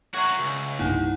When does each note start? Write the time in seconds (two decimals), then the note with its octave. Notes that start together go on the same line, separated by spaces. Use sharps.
0.14 F#4 G#4 C#5 E5 A#5
0.40 C#2
0.79 C2 G2 A#3 D#4 E4 F#5